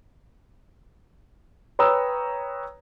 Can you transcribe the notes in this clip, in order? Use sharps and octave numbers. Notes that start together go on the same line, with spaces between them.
B4 C#5 G5 A#5 D#6 E6